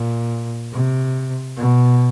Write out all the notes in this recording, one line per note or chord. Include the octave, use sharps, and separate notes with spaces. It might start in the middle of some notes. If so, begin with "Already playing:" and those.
Already playing: A#2
C3
B2